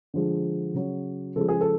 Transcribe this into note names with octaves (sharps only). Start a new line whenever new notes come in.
D3 F3 G#3
C#3 F#3
C#3 F3 G#3 A4
G#4
A4